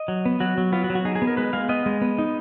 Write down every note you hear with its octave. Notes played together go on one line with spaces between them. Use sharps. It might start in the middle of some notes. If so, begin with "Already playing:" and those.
Already playing: D#5
F#3
B3
F#3 F#4
F#3
B3 F4
F#4
F#3
F#4
D#4 G#4
G#4
B3
A#4
G#3 B4
G#3 F5
B3 D#5
G#3
B3
D#4